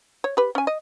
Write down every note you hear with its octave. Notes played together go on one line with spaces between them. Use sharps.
C#5
G4 B4
C#4 G#5
D#5